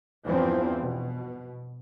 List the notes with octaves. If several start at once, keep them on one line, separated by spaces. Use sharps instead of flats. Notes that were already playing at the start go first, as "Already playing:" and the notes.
E2 G2 E3 F3 B3 C4
B2